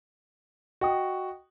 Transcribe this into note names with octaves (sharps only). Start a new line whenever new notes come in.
F#4 D#5 G5 D#6